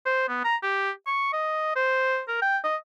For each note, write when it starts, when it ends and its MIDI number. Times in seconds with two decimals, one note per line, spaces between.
0.06 0.26 72
0.29 0.42 59
0.45 0.56 82
0.63 0.91 67
1.07 1.32 85
1.33 1.71 75
1.76 2.21 72
2.28 2.37 70
2.42 2.58 79
2.64 2.76 75